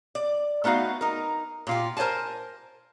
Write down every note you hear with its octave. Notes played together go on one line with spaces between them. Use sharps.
D5
A3 B3 D#4 F#4 F5
D#4 A#4
A#2 F4 G4
A#4 C5 D5 G#5 A5